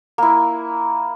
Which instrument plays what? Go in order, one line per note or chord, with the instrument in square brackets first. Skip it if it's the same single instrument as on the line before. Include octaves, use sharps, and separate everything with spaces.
[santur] A#3 E4